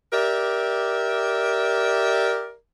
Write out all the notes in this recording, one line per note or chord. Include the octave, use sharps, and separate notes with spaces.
G4 A#4 D5 E5